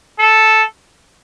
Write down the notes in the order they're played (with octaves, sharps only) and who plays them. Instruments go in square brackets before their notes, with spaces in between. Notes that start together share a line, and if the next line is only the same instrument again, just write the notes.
[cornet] A4